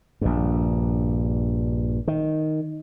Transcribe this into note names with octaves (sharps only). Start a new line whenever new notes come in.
A#1 G2
D#3